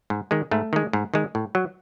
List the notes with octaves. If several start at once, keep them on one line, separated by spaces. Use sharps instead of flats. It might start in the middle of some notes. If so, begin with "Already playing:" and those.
G#2
D#3 G#3
G#2 A3
D#3 G#3
G#2
D#3 G#3
A2
F#3